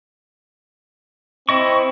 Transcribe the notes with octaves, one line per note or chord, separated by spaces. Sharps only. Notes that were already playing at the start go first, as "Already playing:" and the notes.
C4 E4 D#5 C#6